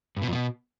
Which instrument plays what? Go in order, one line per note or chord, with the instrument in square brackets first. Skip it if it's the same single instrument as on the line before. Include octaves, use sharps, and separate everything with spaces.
[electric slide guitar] G2
B2
F2
B2